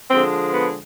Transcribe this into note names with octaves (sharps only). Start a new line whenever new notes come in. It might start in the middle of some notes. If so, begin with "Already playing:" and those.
D3 F3 G#3 C4
B3